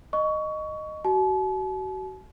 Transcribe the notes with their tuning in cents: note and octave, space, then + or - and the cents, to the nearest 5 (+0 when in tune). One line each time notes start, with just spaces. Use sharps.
D#5 -10 C#6 +20
F#4 +35 A5 -45